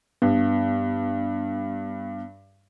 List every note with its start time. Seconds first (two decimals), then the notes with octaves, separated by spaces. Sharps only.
0.22 G2 B3